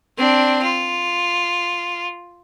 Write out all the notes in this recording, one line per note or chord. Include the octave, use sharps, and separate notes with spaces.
C4 D4
F4